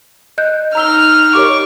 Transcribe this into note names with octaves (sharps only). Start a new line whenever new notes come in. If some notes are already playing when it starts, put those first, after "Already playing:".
D#5 F#6 G6
D#4 A#5 E6 F6 G7
G4 A#4 C#5 C#6 D6